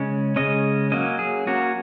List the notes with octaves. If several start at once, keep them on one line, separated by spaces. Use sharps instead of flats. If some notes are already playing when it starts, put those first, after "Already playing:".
Already playing: C#3 G#3 C#4
C#3 G#3 C#4 D#5
F#3 A#3 C#4 D#5
G#4
F#3 A#3 C#4 F#4